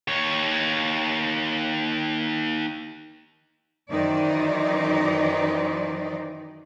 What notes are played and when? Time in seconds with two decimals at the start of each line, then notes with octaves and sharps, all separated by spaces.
0.08 D#2 C#5
3.91 F#2 D#3 E3 D#4 C5 D5